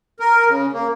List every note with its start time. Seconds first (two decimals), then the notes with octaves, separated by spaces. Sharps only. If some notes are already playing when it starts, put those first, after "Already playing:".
0.20 A#4
0.48 C#3
0.73 A#3